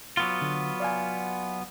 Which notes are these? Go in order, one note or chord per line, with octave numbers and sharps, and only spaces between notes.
F#3 B3 F4
D3
D5 F5 G#5